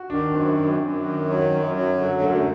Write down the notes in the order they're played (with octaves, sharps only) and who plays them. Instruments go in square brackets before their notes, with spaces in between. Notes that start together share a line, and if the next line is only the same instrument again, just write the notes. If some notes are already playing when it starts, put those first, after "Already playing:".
Already playing: [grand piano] F#4
[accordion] D#3 [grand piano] D4
[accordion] F#2 [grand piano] C4
[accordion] F#2
F#2
D#3
F#3
F#2
F#3
D3
[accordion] F#2 [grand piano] A3